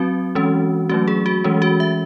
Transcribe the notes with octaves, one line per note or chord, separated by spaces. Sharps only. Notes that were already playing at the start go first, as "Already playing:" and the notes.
Already playing: F#3 C4 F#4
E3 G#3 C#4
F#3 A3 C#4 F#4
G#4
F#4
E3 G#3 C#4
F#4
E5